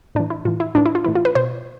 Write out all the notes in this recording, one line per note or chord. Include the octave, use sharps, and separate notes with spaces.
A2 E3 D4
E4
A2 E3 F4
E4
A2 E3 D4
E4
F4
A2 E3 E4
F4
B4
B2 C5